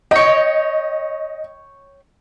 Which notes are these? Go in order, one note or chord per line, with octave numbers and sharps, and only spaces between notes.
C#5 D#5 G5